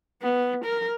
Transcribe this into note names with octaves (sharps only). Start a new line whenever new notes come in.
B3
A#4